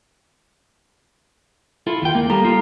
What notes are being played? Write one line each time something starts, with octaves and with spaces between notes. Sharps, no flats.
E4 F4 A4
D#2 G5
A#3
G3 A#3 A4 A#5
F4